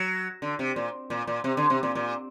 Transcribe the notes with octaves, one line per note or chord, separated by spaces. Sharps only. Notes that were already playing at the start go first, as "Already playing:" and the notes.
Already playing: F#3
D3
C3
A#2
A#2
A#2
C3
D3
C3
A#2
A#2